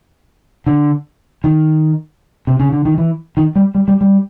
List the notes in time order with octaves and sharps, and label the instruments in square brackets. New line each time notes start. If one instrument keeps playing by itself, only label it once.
[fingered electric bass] D3
D#3
C3
C#3
D3
D#3
E3
D#3
G3
G3
G3
G3